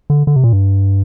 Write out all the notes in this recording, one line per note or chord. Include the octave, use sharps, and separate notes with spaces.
D3
D3
C3
A#2
G2